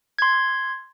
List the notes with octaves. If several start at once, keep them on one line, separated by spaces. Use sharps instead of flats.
C6 G#6